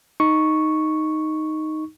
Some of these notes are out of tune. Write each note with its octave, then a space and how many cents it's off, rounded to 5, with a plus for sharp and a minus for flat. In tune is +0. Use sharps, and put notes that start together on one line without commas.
D#4 +0 C#6 +0